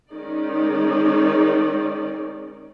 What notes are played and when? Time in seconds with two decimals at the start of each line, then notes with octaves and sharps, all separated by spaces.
0.12 D#3 G#3 C#4 D#4 D5